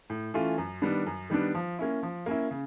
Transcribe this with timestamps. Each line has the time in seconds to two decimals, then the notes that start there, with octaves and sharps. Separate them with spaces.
0.10 A2
0.34 E3 A3 C#4 F4
0.58 F#2
0.82 D#3 G3 B3 D4
1.06 F#2
1.30 D#3 G3 B3 D4
1.55 F3
1.79 A#3 C#4 E4
2.03 F3
2.26 A#3 C#4 E4
2.51 C#3